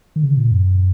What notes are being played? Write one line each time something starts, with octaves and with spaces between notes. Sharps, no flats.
D#3
C#3
A#2
F#2